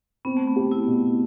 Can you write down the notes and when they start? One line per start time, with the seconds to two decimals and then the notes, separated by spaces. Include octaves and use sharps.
0.25 B3 C4
0.37 A3
0.47 B3
0.56 G4
0.72 E4
0.87 B2